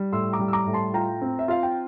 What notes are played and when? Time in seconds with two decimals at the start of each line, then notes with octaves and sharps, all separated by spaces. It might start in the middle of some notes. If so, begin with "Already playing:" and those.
Already playing: G3
0.12 A2 C6 E6
0.33 A#5 D6
0.39 G3
0.48 E6
0.53 A#5 D6
0.67 A2
0.73 A5 C6
0.94 F4 G5 A#5
1.21 C4
1.39 E5
1.48 F4 F5
1.63 G5